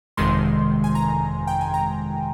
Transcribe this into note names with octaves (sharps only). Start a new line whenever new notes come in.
G1 F2 C3 D#3 G#3 C6
G#5
A#5
G5
G#5
A#5